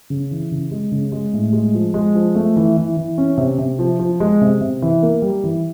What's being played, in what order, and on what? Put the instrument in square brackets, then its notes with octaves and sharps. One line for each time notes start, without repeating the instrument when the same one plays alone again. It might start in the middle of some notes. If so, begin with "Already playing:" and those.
[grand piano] C#3
E3
C#3
G#3
C#3
G#3
A2
G#3
F3
G#3
F3
A3
E3
E3
E3
C#4
C3
C3
F3
F3
G#3
C3
C3
E3
A#3
G3
E3